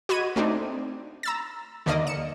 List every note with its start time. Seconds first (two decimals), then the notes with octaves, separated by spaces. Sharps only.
0.09 F#4 D#5 B5 G#6 D#7
0.36 A3 C4 D4 D#4
1.23 A#5 E6 A6
1.86 D#2 D3 A#3 D5 D#5
2.07 C#7 E7